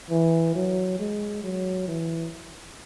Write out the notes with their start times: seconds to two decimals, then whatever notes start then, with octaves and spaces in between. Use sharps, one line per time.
0.10 E3
0.55 F#3
0.99 G#3
1.44 F#3
1.88 E3